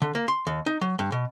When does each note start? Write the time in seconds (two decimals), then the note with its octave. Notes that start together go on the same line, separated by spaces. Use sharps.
0.02 D3
0.15 A#3
0.28 C6
0.47 D#2
0.66 D#4
0.81 F#3
0.99 G2
1.12 B2